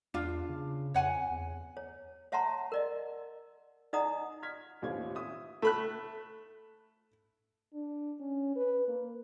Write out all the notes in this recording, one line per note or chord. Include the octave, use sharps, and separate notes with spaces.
E2 D4 F4
C#3
F2 C#5 F#5 G#5
E2
C#5
C#5 E5 F#5 A5 A#5 C6
A#4 D5 D#5
D#4 D5 D#5 F#5 A#5 D#6
F6 G#6 B6
A1 D#2 A3 C4 F4 G#6
E5 D#6
A3 B5 F#6
D4
C#4
B4
A#3